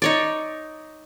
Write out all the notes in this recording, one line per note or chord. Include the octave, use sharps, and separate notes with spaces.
D#4 C#5 D5